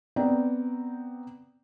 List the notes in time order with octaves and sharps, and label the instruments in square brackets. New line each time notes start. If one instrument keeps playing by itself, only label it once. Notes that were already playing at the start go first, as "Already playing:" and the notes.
[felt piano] B3 C4 D5 G5 A#5